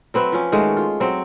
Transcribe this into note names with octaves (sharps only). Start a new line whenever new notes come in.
F#3 C4 B4 E5
F3 C#4
D#3 G#3 A3 F#4
F4
F#3 C4